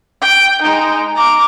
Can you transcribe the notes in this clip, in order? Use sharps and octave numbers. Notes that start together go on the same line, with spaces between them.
G5
G#3 D#4
A#5 D6